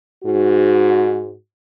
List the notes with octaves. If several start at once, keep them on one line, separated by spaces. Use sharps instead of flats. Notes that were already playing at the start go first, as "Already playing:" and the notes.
G#2 F#4